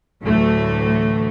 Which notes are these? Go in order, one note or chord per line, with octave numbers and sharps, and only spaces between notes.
D2 A2 E3 F#3 A3